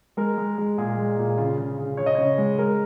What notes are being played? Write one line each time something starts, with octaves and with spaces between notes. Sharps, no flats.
G#3 A#4
G#3
G#3
A#2 G#4
G#3
A#2
C#3 F4
C#3
C#3
C#3 C#5
D#5
C#3 C#5
G#3
G#3 A#4